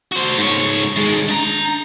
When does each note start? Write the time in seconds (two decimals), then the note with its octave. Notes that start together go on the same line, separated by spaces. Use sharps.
0.12 F#4 C5
0.37 G#2 C#5
0.96 D#3 G#3
1.29 D4 A#5